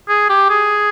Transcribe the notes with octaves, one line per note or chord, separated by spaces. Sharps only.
G#4
G4
G#4